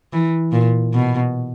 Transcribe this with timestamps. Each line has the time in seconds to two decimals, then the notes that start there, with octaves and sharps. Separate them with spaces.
0.13 E3
0.52 A#2
0.93 B2